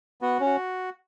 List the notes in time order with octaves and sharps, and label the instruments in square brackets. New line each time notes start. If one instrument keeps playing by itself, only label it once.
[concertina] B3 [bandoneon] F#4
[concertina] C#4
[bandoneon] F#4